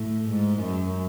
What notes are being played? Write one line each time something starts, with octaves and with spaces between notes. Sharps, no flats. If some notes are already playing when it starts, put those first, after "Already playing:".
Already playing: A2
G#2
F#2